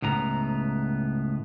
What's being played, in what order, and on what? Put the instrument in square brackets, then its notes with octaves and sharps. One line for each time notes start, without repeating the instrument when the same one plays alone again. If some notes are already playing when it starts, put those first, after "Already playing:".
[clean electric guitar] C#2 A2 B3 A#5